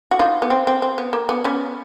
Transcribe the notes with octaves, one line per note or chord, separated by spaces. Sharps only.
F#4
D#4 F4
B3
C4
C4
C4
B3
A#3
B3
B3 C#4